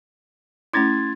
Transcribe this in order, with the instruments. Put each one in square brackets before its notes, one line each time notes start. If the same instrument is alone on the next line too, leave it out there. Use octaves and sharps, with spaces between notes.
[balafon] A3 C#4 E4 [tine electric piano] C6 G#6 A6